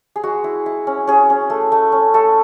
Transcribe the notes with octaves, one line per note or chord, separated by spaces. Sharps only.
G#4
G#3 F#4
E4
E4
C#4
C#4 G#4
C#4
A3
A3
C#4
A3 A4